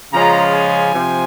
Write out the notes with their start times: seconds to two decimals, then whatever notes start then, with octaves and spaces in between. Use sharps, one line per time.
0.13 C#3 F3 G#3 C#4 F4 A#5
0.54 G#5
0.94 C3 F3